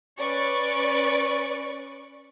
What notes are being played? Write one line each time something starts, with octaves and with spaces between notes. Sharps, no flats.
C#4 B4 D5 C#6